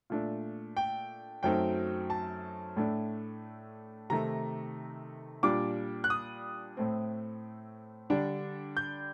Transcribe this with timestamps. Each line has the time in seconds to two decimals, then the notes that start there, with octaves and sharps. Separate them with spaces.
0.10 A#2 A3 D4
0.77 G5
1.43 F#2 F#3 A3 C4 D#4 G5
2.10 A5
2.76 A2 A3 D4
4.10 C3 D#3 A3 D#4 A#5
5.43 A#2 G3 D4 D6
6.04 F#6
6.10 D#6
6.77 A2 A3 C4
8.10 D3 G3 D4
8.77 G6